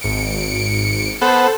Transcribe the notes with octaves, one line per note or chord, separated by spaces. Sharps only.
G#1 C#7 D7
B3 A4 C5 F#5